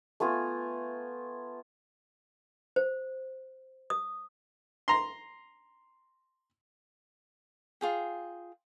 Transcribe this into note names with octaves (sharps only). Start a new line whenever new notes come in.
A3 B3 F4 G#5
C5
D#6
A#5 C6
F4 G#4 G5